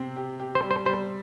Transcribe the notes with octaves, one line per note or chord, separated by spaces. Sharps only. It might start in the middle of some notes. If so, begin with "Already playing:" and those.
Already playing: C3 C4
G4
G4
C5
G3
C5
G3 C5